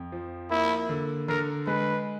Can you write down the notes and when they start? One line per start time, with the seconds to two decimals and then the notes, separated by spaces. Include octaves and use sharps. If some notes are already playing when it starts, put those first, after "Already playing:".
Already playing: F2
0.12 F3
0.50 A#3 E4
0.89 D3
1.28 D3 A#4
1.67 G#3 B4